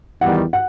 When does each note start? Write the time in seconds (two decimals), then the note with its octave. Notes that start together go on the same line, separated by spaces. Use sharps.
0.21 E2 D#3 G3 F#5
0.53 F#5